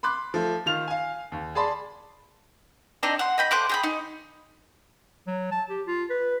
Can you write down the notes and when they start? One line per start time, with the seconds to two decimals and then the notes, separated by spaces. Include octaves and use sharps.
0.03 B5 C6 D6 F#6
0.34 F3 A3
0.66 D#3 F4 F6 F7
0.88 F5 G#5
1.32 D#2
1.55 G#4 D5 A5 B5 C6
3.03 C4 D4 D#4 D#5
3.19 F#5 C6
3.38 D#5 G5 B5
3.51 A3 C5 D6 F#6
3.69 G#4 G5 B5
3.83 D#4
5.27 F#3
5.52 A5
5.70 G4
5.87 F4
6.10 B4